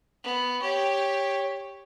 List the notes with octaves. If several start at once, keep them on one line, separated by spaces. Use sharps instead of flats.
B3
G4 C#5